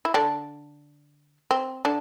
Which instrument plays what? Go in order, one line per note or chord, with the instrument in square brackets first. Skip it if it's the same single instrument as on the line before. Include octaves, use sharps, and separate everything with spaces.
[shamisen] E4
D3 D4
C4
D3 D4